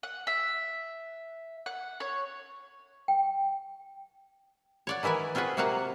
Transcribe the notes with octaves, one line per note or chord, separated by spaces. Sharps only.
F#5
E5
F#5
C#5
G5
C#5 D5 F#5
D#3 E3 E4 B4 G#5
C4 F4 F#4 G#4 B4
C3 A#3 F#4 F5 F#5 A#5